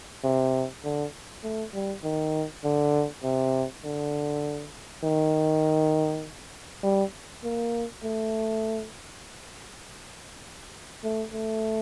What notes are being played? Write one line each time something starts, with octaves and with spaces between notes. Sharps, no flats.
C3
D3
A3
G3
D#3
D3
C3
D3
D#3
G3
A#3
A3
A3
A3